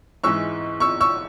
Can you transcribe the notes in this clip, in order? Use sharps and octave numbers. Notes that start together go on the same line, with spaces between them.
G#2 E3 G#3 C#6 E6
C#6 E6
C#6 E6